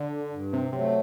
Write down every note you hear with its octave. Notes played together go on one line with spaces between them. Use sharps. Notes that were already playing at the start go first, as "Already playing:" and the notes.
Already playing: D3
G2
C3
C3 F#3 A3